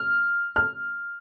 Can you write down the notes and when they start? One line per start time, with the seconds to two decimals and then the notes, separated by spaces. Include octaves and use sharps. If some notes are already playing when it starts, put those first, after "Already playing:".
Already playing: F6
0.56 F6